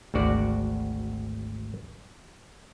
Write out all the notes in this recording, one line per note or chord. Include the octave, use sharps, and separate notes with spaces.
G#1 D2 F#4 D5 F#5